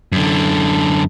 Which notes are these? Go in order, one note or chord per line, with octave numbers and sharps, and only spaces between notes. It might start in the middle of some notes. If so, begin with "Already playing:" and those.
F#2 D3